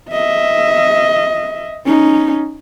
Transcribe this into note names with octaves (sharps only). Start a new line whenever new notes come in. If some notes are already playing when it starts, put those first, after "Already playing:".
D#5 E5
C#4 D#4